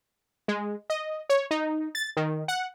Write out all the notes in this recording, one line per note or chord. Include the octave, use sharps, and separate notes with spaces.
G#3
D#5
C#5
D#4
A6
D#3
F#5